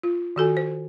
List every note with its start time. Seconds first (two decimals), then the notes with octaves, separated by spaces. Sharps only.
0.03 F4
0.36 D#3 F#4 A4 G#5
0.57 C5